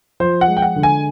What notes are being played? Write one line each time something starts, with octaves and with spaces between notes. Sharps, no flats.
F3 C5
F#5
G#3
G5
F#5
D3
G#5